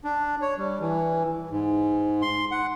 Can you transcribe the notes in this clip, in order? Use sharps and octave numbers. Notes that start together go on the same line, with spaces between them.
D4
C#5
G3
E3
G#2
C6
F#5